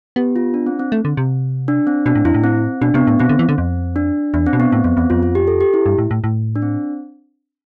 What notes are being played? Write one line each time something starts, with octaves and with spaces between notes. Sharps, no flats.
B3 G4
F4
D4
C4
C4
A3 C4
D3
C3
D4
C4
B2 D4
A2
F2 E4
A2
C4
B2 D4
C3 B3
A2 B3
B2 C4
D3
E3
D3
F2
D4
E2 D4
C4
B2
B3
A2 C4
F2 B3
E2 C4
F2 F4
F4
G4
A4
G4
E4
G2
A2
A2
A2
D4
C4